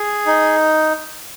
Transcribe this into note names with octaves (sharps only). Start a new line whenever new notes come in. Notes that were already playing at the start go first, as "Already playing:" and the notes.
Already playing: G#4
D#4